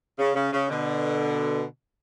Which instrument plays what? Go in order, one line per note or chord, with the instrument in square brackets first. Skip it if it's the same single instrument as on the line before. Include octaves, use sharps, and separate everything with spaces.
[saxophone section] C#3
C#3
C#3
B2 D3